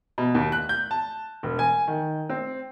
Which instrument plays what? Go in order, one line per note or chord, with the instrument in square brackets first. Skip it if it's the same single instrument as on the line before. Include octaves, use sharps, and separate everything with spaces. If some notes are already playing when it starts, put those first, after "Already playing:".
[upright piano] B2
D#2
F#6
G6
A5
E1
G#5
D#3
C4